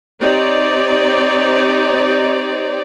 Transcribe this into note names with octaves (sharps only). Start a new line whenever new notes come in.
C4 D#4 G4 C#5 D5